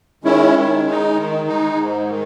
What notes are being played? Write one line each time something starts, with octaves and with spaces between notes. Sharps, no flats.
D#3 G#3 C#4 E4
D#3
G#3 D#4
D#3
G#3 D#4
G#2
D#3